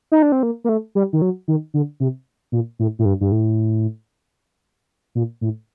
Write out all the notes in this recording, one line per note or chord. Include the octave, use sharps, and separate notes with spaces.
D#4
D4
C4
A#3
A#3
A3
G3
D#3
F#3
D#3
D3
C3
A#2
A2
A2
G2
G2
A2
A#2
A2